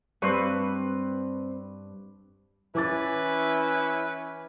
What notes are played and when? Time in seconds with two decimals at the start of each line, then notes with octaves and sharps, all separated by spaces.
0.22 G2 C4 B4 C#6
2.75 E3 C#4 E4 B4 D6 A6